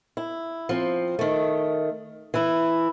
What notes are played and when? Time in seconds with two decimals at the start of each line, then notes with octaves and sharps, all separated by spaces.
0.17 E4
0.69 F3 C4
1.19 D#3 A3
2.34 E3 E4